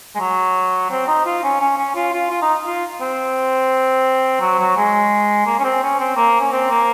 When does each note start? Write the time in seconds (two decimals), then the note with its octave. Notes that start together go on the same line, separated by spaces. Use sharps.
0.15 G#3
0.20 F#3
0.90 C4
1.07 D#4
1.25 F4
1.43 C#4
1.61 C#4
1.78 C#4
1.95 F4
2.13 F4
2.30 F4
2.42 D#4
2.66 F4
3.01 C4
4.41 F#3
4.59 F#3
4.76 G#3
5.46 A#3
5.59 C#4
5.64 C4
5.83 C#4
6.00 C4
6.16 A#3
6.41 C#4
6.52 C4
6.70 A#3